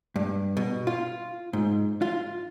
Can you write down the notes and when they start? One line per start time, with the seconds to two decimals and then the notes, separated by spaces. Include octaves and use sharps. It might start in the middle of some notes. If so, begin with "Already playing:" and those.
0.16 G2
0.57 B2
0.87 F4
1.53 G#2
2.02 F4